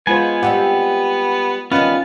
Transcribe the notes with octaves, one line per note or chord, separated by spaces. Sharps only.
G#3 B3 F4 C5 G#5
G3 C4 G4 F#5
D#3 G3 B3 C#4 F4